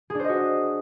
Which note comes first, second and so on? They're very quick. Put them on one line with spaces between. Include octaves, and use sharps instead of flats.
G#4 D4 C5 D#5 F#4